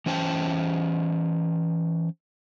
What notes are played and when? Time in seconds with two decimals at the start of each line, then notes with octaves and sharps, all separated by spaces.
0.06 E3 C#4 C5 G5 A5